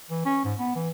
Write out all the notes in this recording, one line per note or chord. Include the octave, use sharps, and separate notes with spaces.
E3
C#4
G#2
B3
E3